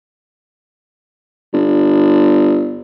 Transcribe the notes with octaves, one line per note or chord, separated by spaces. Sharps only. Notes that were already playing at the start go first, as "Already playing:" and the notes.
G1